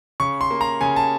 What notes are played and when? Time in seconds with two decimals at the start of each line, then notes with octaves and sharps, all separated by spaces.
0.20 C#3 C#6
0.41 C6
0.51 A#3
0.61 A#5
0.81 C#3 G#5
0.96 A5